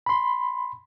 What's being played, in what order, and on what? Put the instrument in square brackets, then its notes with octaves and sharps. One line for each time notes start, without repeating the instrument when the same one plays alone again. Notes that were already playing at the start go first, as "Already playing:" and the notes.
[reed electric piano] B5 C6